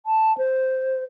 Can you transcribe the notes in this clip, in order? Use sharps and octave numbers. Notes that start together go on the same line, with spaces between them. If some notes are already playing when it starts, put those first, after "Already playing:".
A5
C5